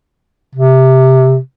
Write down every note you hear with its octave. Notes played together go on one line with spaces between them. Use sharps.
C3